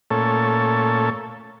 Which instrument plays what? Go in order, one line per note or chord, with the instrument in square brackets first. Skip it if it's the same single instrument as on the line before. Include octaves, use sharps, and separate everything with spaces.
[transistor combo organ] A#2 A3 C#4 A4